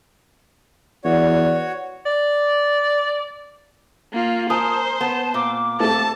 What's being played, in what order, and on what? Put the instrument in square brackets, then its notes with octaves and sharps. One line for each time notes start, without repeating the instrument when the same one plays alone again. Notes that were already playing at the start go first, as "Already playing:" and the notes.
[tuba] E2 [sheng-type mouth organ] F#4 C#5 [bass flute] D5
[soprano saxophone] D5
[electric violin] A#3 F4
[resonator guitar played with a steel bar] A#4 [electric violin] C5 [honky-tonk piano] G#5 D#6 [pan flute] A5
[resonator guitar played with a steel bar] B3 [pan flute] A5
[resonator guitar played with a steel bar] A#2 [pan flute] D6
[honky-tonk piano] A3 C4 A4 [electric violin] A5